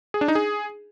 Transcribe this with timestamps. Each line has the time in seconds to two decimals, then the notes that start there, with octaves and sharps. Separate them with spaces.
0.14 G#4
0.21 D4
0.28 D#4
0.35 G#4